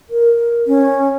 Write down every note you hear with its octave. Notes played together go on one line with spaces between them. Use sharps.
A#4
C#4